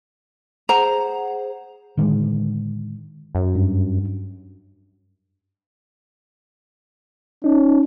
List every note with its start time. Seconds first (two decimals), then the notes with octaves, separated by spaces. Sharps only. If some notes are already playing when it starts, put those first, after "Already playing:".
0.69 G#4 C5 F#5 A#5
1.97 A2 D3 D#3 G#3
3.35 F#2
3.55 G2
7.44 C#4 D#4